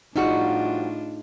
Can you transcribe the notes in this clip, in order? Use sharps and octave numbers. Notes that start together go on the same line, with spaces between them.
A2 F3 G3 D4 D#4 F4 F#4 G#4